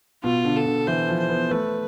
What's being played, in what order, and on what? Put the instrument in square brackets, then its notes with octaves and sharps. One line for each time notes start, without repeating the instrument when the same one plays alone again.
[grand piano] B2 [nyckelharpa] F4
[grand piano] D3
[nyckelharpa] A4
[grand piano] D3
[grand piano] E3 [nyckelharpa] C5
[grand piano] F3
[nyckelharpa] C5
[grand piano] B3
[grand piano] A3 [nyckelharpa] B4